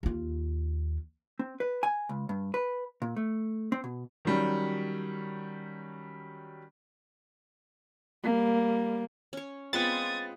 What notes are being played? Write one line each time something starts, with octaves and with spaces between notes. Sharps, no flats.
D#2 F4
C4
B4
G#5
C#2
G2
B4
A#2
A3
C4
B2
D#3 F#3 G3 C#4
G3 A#3
C#4 C#5
G#3 B3 C4 F4 B5 D#6 G#6 A6